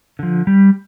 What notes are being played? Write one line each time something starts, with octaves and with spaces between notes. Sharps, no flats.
D3 F3
G3